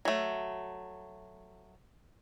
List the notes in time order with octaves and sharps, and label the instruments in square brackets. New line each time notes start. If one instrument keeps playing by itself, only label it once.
[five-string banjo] F#3 A3